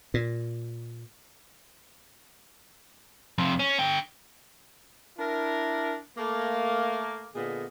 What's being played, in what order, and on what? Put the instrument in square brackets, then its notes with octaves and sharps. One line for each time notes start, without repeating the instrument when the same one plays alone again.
[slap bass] A#2
[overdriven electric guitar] F2 C3
C#4
D3 G5
[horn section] D4 E4 A#4
A3 A#3
A#2 D3 B3 G#4 D#5